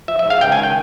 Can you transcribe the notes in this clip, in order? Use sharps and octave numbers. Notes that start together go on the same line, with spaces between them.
F3 E5
E5
G#2
F5
C#2 G5
G#5
D#3
G5